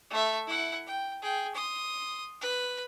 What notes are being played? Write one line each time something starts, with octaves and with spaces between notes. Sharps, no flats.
A3 E5
E4 F#5
G5
G#4 G5
C6 D#6
B4